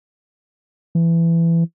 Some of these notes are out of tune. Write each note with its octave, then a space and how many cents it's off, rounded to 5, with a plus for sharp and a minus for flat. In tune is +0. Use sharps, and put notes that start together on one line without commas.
E3 +20